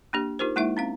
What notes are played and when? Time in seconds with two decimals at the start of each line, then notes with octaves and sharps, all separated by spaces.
0.13 A#3 D4 G4
0.39 D#4 F4 G4 A#4 C5
0.56 G#3 A#3 D#4 E4 E5
0.77 C4 C#4 F5